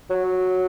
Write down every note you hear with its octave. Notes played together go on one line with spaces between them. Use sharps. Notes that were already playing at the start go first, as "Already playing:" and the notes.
F#3